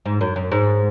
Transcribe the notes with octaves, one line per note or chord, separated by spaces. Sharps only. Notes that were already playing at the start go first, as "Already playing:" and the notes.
G#2
F#2
F#2
G#2